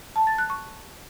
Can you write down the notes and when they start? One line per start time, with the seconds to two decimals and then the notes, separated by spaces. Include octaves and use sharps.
0.16 A5
0.27 A6
0.38 F#6
0.50 C#6